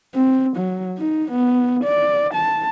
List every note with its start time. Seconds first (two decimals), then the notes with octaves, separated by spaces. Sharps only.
0.15 C4
0.57 F#3
0.98 D#4
1.31 B3
1.84 D5
2.34 A5